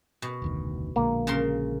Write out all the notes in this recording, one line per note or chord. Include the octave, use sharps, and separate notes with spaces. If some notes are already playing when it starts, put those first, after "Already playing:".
B2
F1 D2 D#3
A#1 D3 G#3 A#3
C#3 A#4 C6